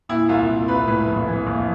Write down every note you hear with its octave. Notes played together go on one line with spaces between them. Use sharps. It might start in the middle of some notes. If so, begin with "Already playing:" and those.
A#2 E4
C2 F4
C2
C2 B4
A2 B4
A#1
E3
A#1